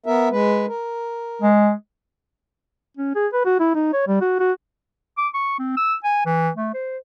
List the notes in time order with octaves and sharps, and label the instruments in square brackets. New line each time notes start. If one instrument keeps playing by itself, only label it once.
[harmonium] B3 A#4 E5
G#3 B4
A#4
[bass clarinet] G#3
[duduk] C#4
G#4
B4
F#4
E4
D#4
C#5
G3
F#4
F#4
[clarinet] D6
C#6
C4
E6
G#5
E3
A3
C5